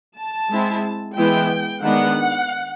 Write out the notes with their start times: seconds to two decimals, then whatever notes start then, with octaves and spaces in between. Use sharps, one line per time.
0.17 A5
0.51 G#3 C4 E4
1.16 E3 G#3 B3 E4 G5
1.82 D#3 G#3 B3 D4 F#5